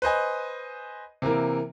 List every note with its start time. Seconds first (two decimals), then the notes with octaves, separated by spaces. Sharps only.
0.02 B4 C5 D#5 G#5
1.22 C3 E3 A#3 A#4